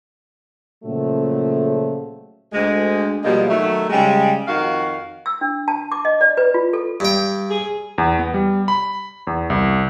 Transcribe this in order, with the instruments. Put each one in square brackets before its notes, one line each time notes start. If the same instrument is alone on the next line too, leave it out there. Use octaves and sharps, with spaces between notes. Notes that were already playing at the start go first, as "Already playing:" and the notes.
[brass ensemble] A#2 C#3 F3 F#3 A3
[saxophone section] D2 G#3
B2 F3 G3 G#3 A#3
D#3 F#3 A3
C#3 G3 G#3
F2 D#3 F#4 F5
[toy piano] E6
D4
A5
D6
D#5
D5
B4
F4
A4
[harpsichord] G2 G5
[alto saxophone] G#4
[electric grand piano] E2
B3
G3
B5
E2
C2